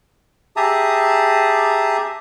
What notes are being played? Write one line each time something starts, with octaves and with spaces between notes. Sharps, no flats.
G4 G#4 E5 A5 A#5 D#6